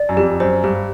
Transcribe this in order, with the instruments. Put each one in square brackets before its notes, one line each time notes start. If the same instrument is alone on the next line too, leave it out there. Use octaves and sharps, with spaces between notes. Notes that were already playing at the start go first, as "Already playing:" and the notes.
Already playing: [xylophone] D5
[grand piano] F#2
[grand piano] F2 [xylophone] G4
[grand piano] F#2 [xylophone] C5
[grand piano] G2 [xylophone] G4